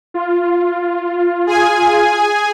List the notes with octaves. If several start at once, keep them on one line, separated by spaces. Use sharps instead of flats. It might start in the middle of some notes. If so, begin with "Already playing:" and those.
F4
G#4 G#5